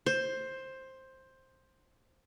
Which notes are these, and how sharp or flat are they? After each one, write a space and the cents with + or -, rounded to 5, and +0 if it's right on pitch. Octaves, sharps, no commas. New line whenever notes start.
C5 +10